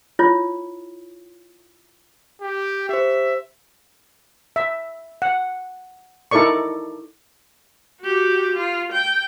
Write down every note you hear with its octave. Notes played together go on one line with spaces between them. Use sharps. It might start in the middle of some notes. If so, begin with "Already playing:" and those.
E4 F4 C#5
G4
G4 C5 E5
E5
F#5
D#4 E4 A4 A#4 D5 C#6
F#4 G4
F4
G5